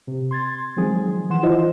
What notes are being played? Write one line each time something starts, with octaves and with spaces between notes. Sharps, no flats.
C3
C6 G#6 A6
D#3 F3 F#3 G#3 C4 G#4
E3 F#5 C6 E7
E4 F4 C5 D#5